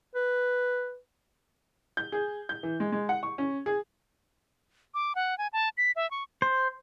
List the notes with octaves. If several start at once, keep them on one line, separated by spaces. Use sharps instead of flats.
B4
G6
G#4
G6
E3
G#3
G#3
F#5
C#6
C#4
G#4
D6
F#5
G#5
A5
B6
E5
C#6
C5